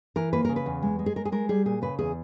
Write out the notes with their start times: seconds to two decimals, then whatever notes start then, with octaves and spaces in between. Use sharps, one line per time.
0.16 E3 A#4
0.33 A#3 B4
0.45 C#3 A#4
0.56 B4
0.66 E2
0.83 G#3
0.99 G#3
1.06 G#4
1.16 G#3 A#4
1.25 G#4
1.32 G#3 A#4
1.49 G3 G#4
1.65 A#2 G#4
1.82 C#3 B4
1.99 E2 G#4